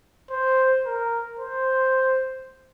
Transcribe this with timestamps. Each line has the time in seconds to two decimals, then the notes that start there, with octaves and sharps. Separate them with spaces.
0.31 C5
0.86 A#4
1.39 C5